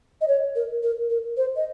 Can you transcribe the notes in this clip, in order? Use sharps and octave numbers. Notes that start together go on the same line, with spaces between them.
D#5
C#5
A#4
A#4
A#4
C5
D#5